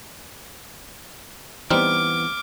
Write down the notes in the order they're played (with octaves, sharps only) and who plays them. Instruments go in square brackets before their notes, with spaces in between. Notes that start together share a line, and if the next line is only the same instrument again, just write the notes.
[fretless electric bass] E3 B3 [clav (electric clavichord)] G3 C4 D#4 [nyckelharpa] D6 [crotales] F6